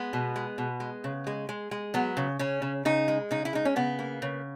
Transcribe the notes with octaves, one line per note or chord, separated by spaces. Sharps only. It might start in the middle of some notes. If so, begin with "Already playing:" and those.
Already playing: G#3 B3
B2
G#3
B2
G#3
C#3
G#3
G#3
G#3
F#3 B3
C#3
C#3 C#4
C#3
C#3 D#4
G#3
C#3 D#4
E4
G#3 D#4
C#4
C#3 B3
A#3
C#3